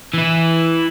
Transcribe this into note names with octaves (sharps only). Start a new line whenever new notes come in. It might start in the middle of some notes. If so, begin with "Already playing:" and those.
E3 E4